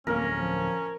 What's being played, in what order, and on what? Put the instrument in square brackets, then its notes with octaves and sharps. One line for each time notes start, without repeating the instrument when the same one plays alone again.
[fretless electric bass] D1 G#1 F2 [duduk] A#3 [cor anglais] C#4 [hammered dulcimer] A#4
[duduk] F3